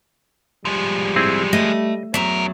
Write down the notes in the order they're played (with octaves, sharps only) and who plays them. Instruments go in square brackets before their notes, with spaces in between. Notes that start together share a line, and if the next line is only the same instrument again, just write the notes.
[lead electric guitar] F3 G#3 [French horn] G3
[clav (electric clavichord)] C4 E4 G#4
[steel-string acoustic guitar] A3 [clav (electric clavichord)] D#5
[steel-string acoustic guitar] E2 F#3 [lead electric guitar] D4 A#4 [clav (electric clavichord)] E5